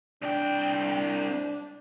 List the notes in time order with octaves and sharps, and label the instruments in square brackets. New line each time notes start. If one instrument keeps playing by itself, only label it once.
[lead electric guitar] C2 G5 [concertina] D4